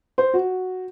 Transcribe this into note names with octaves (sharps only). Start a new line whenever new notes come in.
C5
F#4